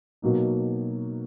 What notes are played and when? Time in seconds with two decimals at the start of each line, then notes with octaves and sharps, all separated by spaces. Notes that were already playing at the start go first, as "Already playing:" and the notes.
0.22 B2 F#3 A#3 D#4